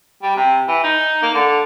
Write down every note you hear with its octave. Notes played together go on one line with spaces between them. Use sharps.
G3
C3
E3
D#4
A#3
D3